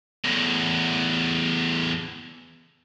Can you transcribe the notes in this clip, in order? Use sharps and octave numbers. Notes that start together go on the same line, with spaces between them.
E2 A2